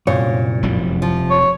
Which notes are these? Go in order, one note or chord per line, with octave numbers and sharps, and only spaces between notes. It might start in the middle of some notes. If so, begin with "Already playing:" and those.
C2 F#2 A#2 C#5
F1 F2 G3
F3
C#5